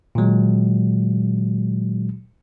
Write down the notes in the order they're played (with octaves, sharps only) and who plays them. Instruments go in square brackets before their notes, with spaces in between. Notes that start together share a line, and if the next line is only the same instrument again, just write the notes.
[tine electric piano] A#2 D#3 F#3 G#3